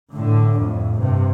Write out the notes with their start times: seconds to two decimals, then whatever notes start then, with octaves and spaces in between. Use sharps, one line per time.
0.13 A2 D3
0.56 F2 A2
0.99 G2 C3